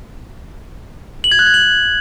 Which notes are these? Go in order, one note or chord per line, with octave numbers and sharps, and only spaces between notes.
F#7
G#6
F#6
G#6
F#7